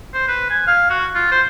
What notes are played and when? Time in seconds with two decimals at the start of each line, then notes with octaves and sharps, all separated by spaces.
0.14 C5
0.28 B4
0.50 G#5
0.67 F5
0.90 F#4
1.15 F4
1.32 C5